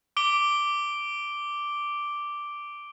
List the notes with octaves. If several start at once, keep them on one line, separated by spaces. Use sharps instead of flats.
D6 D7 G7